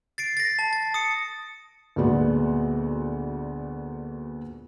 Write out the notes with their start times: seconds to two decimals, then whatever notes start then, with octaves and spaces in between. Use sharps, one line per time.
0.18 A6 C7 D7
0.37 A6 A#6
0.59 A5
0.73 A6
0.94 D#6 C#7
1.96 D2 A#2 G#3 B3 F#4 D5